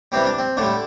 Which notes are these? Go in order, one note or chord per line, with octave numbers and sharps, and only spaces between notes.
C3 E3 G3 C4
D4
C4
A2 D3 G3 D4